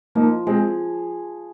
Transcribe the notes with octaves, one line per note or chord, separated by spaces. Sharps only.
F3 A#3 D#4
G#3 C4 G#4